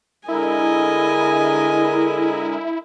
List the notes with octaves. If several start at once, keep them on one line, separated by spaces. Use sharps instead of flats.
D3 G#3 E4 A#4 D#5 G#5